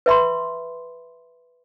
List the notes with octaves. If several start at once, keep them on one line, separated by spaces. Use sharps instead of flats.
B4 E5 B5 C6